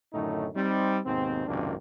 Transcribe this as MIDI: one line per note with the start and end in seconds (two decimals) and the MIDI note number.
0.13 0.47 42
0.13 0.47 45
0.13 0.47 50
0.13 0.47 51
0.13 0.47 57
0.13 0.47 63
0.54 0.98 55
0.54 0.98 60
0.54 0.98 63
1.05 1.44 39
1.05 1.44 44
1.05 1.44 47
1.05 1.44 60
1.47 1.74 32
1.47 1.74 37
1.47 1.74 42
1.47 1.74 48
1.47 1.74 58
1.47 1.74 62